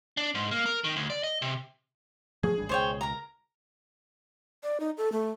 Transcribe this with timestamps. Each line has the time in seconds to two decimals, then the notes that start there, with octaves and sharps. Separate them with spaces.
0.17 D4
0.35 G#2
0.51 A#3
0.66 A#4
0.84 D#3
0.96 D2
1.10 D5
1.24 D#5
1.42 C3
2.43 F3 A3 G#4
2.58 G#1 G3 D4
2.69 C#2 B2 C5 C#5 G5
3.01 A#4 A#5
4.63 D5
4.80 D#4
4.98 A4
5.12 A3